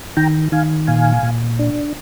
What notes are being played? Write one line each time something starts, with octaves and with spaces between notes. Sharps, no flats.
D#3 G5 A#5
D#3 F5 G#5
A#2 F5 G#5
A#2
D4